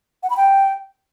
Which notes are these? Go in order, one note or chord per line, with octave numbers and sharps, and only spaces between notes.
F#5
B5
G5